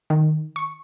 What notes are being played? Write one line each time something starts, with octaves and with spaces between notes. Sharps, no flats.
D#3
C#6